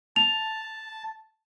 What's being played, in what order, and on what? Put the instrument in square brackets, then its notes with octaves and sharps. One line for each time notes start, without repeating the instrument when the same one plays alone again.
[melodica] A5 [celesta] F7